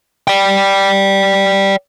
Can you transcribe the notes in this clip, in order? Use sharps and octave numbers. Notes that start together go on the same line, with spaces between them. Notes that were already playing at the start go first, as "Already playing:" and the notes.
D5 G5